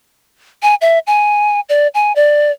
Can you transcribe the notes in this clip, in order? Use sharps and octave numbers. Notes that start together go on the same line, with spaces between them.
G#5
E5
G#5
D5
G#5
D5